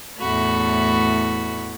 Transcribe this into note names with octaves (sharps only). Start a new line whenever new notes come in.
E2 A2 A3 F#4 B5